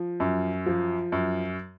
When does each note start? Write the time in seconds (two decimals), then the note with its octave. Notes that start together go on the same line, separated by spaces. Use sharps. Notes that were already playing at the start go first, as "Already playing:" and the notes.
Already playing: F3
0.20 F#2
0.66 F3
1.12 F#2